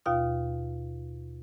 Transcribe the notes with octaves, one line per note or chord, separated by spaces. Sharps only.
D#2 B2 F4 F5 D#6